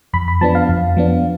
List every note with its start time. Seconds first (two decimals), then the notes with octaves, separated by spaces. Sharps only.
0.13 F2 B5
0.28 B5
0.41 F3 B3 D4 A5
0.55 F5
0.69 F2
0.97 F3 B3 D4